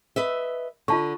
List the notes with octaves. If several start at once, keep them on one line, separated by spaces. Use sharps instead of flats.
B4 D#5 E5
D3 F4 A5 C#6